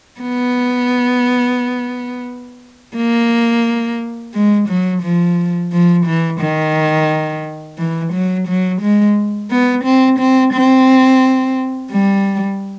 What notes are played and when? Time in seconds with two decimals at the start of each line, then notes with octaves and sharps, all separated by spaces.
0.21 B3
2.96 A#3
4.33 G#3
4.69 F#3
5.03 F3
5.72 F3
6.06 E3
6.40 D#3
7.78 E3
8.13 F#3
8.48 F#3
8.81 G#3
9.50 B3
9.84 C4
10.19 C4
10.53 C4
11.92 G3